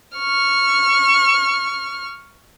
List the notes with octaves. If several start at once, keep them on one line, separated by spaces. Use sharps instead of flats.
C#6 F6